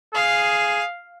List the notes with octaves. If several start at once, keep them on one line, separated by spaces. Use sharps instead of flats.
G#4 F5